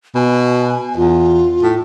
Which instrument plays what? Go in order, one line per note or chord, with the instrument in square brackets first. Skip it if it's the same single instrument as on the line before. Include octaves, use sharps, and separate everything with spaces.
[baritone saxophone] B2 [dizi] G#5
[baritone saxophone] E2 [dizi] F4
[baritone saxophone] A2